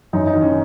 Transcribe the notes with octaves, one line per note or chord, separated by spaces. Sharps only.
F#2 D#4
D#4
D#3
C#4